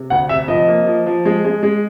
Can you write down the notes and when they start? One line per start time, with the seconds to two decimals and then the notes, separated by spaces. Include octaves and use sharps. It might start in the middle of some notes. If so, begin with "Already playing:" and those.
Already playing: C3
0.10 D2 F#5
0.29 C3 E5
0.48 F3 D#5
0.68 A#3
0.87 F3
1.06 F3
1.25 G#3
1.44 G#3
1.63 G#3